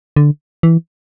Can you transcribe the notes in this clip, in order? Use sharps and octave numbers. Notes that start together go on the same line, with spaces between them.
D3
E3